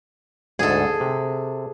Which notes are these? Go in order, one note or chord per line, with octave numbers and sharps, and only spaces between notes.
D2 G#2 G#4 A4
C3